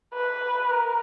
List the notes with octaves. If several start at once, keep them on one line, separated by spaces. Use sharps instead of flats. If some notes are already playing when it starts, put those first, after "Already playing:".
B4
A#4